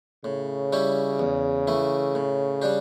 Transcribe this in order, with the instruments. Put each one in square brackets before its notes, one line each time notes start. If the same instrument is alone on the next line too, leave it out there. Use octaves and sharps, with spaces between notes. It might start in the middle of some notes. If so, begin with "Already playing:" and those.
[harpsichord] A2 [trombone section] C#3
[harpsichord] G3 C#4 E4 G4
E2
E3 A3 E4
A2
G3 D4 G4